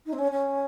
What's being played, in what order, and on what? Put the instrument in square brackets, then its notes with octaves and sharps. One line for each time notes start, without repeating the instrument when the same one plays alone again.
[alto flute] D#4
C4
C#4
C#4